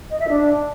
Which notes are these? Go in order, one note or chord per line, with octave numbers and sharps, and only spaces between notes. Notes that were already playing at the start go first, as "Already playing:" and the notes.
D#5
E5
D4